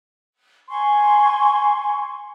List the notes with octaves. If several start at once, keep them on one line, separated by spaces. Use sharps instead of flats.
G#5 C6 C#6